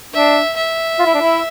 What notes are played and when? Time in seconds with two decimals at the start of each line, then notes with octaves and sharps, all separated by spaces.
0.14 D4 E5
0.57 E5
0.99 F4
1.06 E4
1.14 D4
1.21 E4